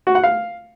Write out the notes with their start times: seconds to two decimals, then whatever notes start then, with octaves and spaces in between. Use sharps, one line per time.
0.07 F#4
0.15 F#5
0.24 F5